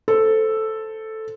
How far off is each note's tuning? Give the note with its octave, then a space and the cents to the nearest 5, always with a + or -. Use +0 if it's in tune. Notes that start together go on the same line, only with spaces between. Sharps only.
A4 +0 C5 -10